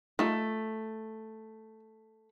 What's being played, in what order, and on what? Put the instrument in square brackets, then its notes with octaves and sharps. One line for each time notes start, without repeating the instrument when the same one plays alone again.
[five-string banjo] A3 [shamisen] D#4 F4 A4